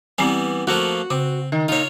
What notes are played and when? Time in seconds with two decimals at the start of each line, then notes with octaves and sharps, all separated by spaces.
0.18 E3 G3 B3 C4 G#5
0.67 F3 A3 A#3 F#4
1.10 C#3 C4
1.52 D#3
1.68 A#2 D#4 F4 C#5